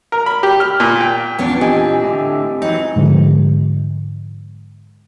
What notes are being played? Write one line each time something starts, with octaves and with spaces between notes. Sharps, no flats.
A#4
B5
G4
F6
A#2
G5
E2 A#2 E3 B3 C#4 D4
C4 G4 D#5 G#5
A2 D3
E3 F#3 C4 D#4
G#2 D3 F3